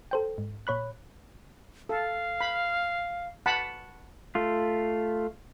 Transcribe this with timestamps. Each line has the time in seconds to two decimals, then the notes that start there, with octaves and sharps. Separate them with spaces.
0.11 A4 C5 G5
0.38 G#2
0.67 A#2 C#5 B5 F#6
1.89 A4 F5
2.41 B5
3.46 F#5 A5 B5
4.35 A3 F4